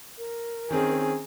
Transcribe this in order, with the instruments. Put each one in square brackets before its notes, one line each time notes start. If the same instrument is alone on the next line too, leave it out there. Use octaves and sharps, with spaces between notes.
[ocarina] A#4
[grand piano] D#3 C4 C#4 [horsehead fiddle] G#4